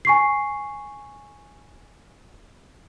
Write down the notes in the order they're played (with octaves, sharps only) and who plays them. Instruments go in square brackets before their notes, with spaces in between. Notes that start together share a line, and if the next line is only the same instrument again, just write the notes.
[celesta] G#5 C#6 C7